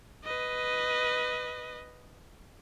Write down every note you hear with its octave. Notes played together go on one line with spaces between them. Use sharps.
B4 D#5